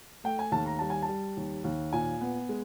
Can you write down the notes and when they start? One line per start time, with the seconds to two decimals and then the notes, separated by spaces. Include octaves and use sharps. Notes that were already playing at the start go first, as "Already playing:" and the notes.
0.24 A3 G5
0.39 G#5
0.52 D#2 A5
0.66 A#5
0.79 G3 A5
0.90 G#5
1.02 A5
1.09 G3
1.37 D#2
1.64 D#2
1.93 A#2 G#5
2.21 B3
2.49 G#3